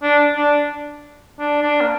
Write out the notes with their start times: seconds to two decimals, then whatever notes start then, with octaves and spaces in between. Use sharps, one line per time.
0.03 D4
0.36 D4
1.39 D4
1.62 D4
1.81 A#3